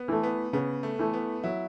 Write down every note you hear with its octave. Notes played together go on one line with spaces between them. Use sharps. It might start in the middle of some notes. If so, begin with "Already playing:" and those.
Already playing: B3
E3 A3
B3
C#3 B3
A3
E3 A3
B3
F#3 E4